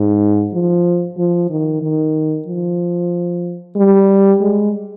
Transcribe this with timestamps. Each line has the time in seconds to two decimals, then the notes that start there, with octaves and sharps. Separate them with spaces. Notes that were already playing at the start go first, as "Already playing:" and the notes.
Already playing: G#2
0.53 F3
1.18 F3
1.50 D#3
1.82 D#3
2.47 F3
3.76 G3
4.41 G#3